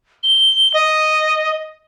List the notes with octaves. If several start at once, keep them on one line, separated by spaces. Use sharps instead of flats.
G7
D#5